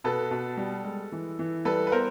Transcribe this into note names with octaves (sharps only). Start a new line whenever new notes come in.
B2 A4 B4
B2
G3
G#3
E3
E3
G3 A4 B4
B4
B3 A#4 C5